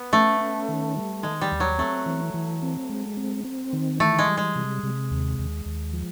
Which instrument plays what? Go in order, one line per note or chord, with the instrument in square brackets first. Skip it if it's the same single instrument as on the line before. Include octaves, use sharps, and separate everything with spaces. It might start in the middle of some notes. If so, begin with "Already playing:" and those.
Already playing: [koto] B3
[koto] A3 [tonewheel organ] C#4
[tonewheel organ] C#4
D#3
G3
[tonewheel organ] D#3 [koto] G#3
[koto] G3
[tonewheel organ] D#2
[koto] F#3
[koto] A3 [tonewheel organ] C4
[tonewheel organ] E3
E3
C4
G#3
C4
C4
D#3
[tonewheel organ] E3 [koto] A3
[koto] G#3
[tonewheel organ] G3
[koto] G#3
[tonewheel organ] C3
C3
D#2
D#2
D#2
F3